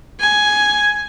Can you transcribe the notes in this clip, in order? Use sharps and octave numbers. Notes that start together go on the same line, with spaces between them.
G#5